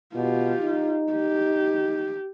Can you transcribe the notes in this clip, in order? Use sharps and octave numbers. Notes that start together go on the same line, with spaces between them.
B2 F4 G4
D#4
G4